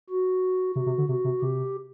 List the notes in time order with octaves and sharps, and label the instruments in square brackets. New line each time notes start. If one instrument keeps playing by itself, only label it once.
[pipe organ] F#4
[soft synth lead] C3 [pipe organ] F#4
[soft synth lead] C3
D3
[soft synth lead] C3 [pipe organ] F#4
[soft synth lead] C3
[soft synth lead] C3 [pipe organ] G4